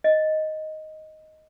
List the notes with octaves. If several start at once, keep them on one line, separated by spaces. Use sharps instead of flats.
D#5